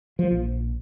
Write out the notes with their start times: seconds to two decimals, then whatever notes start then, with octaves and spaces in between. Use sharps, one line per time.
0.19 F3
0.31 A#1